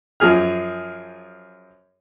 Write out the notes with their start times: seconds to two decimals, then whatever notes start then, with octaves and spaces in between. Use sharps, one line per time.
0.20 F#2 F3 G#4 F6